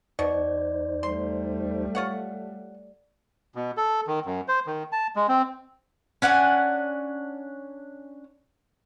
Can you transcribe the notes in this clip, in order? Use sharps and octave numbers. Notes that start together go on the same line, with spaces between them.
E2 B2 D#4 C5 D5
G3 A3 C6
F4 C#5 F#5
B2
A4
D#3
F#2
C5
D#3
A5
G#3
C4
C#4 D4 F#5 G#5